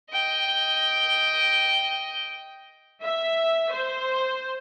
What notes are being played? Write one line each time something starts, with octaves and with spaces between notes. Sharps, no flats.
D#5 G5
E5
C5